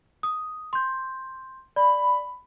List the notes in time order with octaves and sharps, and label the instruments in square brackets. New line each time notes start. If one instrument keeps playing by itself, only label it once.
[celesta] D#6
C6 G6
[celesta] D5 [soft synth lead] B5